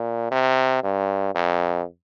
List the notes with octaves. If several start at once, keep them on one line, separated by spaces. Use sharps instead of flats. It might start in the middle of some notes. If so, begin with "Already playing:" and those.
Already playing: A#2
C3
G2
F2